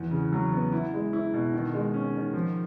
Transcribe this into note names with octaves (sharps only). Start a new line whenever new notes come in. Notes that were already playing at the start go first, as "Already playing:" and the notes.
Already playing: E2
C#3
F#3
B3
E4
G#3
E4
B2
D#3
G#3
C#4
D#3
F3